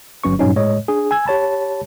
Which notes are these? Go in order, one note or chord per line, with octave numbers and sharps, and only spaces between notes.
G1 F#3 C#4 B4 C#6
G2 A#2 F#3 C#4 D#4
A2 G#3 C#5 D#5
D4 G#4
G#5 E6 G#6
G4 C#5 A5 B5